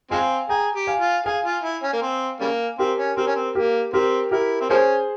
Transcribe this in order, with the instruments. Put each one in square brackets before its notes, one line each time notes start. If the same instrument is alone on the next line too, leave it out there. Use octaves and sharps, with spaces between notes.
[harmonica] F3 G#3 C4 [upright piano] F5 G#5
[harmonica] G#4 [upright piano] G5 A#5
[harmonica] G4
[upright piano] F5 G#5
[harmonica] F4
[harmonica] G#4 [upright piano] F5 G#5
[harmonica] F4
E4
C#4
A#3
C4
C#3 G3 A#3
[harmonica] C4 [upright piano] G4 A#4
[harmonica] C#4
[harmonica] C4 [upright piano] G4 A#4
[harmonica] C#4
C4
[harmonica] A#3 [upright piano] G4 A#4
[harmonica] C4 [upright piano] G4 A#4
[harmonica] E4 [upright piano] G4 A#4
[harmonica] C4
[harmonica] F3 A#3 C#4 [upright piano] G#4 C5